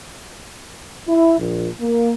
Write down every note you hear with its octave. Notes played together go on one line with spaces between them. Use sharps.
E4
A#1
A#3